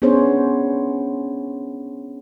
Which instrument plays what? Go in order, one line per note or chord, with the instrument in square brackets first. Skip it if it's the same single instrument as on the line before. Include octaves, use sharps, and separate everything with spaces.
[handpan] B3 C#4 D4 G#4 C5 C#5